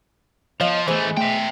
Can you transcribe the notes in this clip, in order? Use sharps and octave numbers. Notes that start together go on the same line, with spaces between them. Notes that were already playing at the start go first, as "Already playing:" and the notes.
F3 B3 C#5 D#5 F5
E3 G#3 A3 B3 C5
A3 E5 G5 C6